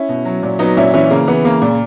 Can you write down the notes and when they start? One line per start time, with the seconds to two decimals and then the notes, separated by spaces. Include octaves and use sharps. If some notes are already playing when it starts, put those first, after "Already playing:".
Already playing: C#4 E4
0.09 B2
0.25 F#3
0.43 A#2
0.59 F#3 B3 D#4
0.77 A#2 C#4 E4
0.94 E3 C#4 E4
1.10 C#3 A#3
1.28 E3 B3
1.44 C#3 A#3
1.62 A#2 A#3